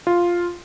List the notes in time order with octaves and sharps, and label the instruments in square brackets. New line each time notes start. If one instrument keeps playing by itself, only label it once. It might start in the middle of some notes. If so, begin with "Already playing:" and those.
[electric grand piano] F4